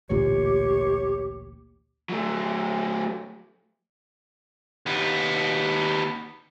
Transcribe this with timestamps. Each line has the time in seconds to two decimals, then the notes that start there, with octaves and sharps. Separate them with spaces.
0.10 A1 D2 A#2 G4 C#5
2.09 F#3 A3
4.86 D#2 B3